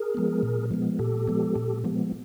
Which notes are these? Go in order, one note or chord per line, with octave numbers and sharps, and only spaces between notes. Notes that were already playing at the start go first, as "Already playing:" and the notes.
Already playing: G#4 A#4
F3 G#3 B3
A#2
F3 G#3 B3
A#2 G4 A4
F3 G#3 B3
A#2
F3 G#3 B3